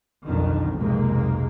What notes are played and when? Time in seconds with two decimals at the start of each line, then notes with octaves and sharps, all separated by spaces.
0.24 B1 F2 D3 D#3
0.75 B1 F2 G#2 C3 G#3 A#3